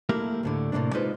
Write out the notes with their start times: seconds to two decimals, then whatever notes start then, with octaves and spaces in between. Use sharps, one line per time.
0.09 A3 A#3 E4 G4 A#4 F5
0.43 D2 A2 D3
0.72 A2 C3 A3 A#3 D4
0.93 G#3 D#4 F4 B4 C5